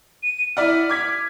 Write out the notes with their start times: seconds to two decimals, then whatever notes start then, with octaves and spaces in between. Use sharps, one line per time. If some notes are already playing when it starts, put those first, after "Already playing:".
0.23 D#7
0.57 E4 D5 F#5 F6
0.90 D6 G#6 B6